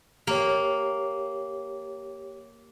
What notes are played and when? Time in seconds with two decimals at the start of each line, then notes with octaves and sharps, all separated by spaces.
0.27 A#3 G4 C#5